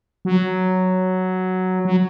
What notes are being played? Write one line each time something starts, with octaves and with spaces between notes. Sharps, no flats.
F#3
F#3